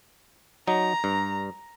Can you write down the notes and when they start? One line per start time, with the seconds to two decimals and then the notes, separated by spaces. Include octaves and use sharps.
0.68 F#3 D#4 A#5
1.04 G2